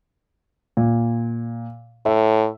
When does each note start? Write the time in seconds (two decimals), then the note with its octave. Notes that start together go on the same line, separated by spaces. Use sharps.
0.77 A#2
2.06 A2 E5